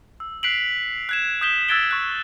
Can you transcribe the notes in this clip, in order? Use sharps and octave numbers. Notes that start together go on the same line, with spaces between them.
E6
F#6 B6 C7 D7 F7 F#7
F#6 G#6 E7
D#6 G6 B6 E7 G7
E6 F#6 G#6 A6 D7 G7
C#6 F#6